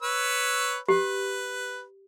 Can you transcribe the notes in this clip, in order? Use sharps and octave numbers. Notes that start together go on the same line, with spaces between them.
B4 C#5 E6
G4 B4